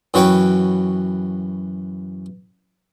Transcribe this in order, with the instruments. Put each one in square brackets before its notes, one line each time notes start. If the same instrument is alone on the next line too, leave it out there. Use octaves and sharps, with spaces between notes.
[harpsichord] F#2 E3 F#4 B4 C#5 G5